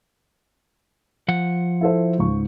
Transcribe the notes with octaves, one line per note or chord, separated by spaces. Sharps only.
F3 F#5
E4 A4 C5
C#2 G#2 C#6